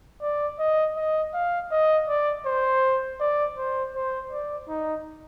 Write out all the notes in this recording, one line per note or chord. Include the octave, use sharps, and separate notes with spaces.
D5
D#5
D#5
F5
D#5
D5
C5
D5
C5
C5
D5
D#4